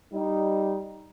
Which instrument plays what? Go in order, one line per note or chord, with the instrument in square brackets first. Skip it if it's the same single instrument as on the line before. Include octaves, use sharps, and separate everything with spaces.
[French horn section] G3 D#4